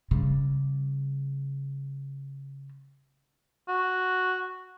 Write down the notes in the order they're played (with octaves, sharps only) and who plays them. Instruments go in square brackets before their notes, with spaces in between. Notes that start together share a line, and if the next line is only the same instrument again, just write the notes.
[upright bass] C#3 G3
[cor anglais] F#4